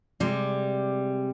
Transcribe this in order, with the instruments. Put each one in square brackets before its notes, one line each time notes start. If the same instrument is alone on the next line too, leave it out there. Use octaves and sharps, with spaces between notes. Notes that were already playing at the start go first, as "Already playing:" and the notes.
[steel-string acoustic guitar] C3 G3 G#3